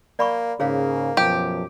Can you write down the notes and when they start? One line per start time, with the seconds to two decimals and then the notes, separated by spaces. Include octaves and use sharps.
0.19 A#3 D5 B5 C#6
0.60 G#2 C#3 A#3 G#4 C#5 F5
1.17 F#2 B2 F3 G4